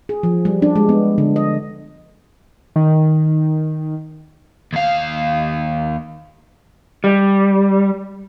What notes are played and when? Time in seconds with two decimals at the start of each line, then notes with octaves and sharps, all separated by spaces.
0.09 G#4
0.23 F3
0.45 G3
0.62 D4
0.76 G#3
0.89 B3
1.18 D3
1.36 D#5
2.76 D#3
4.73 D#2 F5
7.04 G3